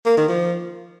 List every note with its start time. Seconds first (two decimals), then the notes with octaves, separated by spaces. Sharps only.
0.06 A#3
0.17 D#3
0.29 F3